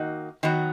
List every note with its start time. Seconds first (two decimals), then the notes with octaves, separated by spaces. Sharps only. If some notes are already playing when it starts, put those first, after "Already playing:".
Already playing: D#3 A#3 D#4 F#4
0.43 D#3 F#3 B3 F#4